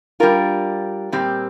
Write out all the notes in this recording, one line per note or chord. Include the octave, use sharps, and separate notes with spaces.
G3 D4 F4 A#4
A#2 G3 C4 G4